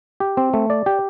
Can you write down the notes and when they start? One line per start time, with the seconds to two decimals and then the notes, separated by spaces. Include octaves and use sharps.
0.20 G4
0.37 C4
0.54 A3
0.70 D5
0.86 G4